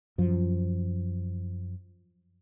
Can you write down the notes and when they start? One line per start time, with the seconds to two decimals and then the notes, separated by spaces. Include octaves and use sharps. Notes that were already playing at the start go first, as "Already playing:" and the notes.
0.18 F#2 F3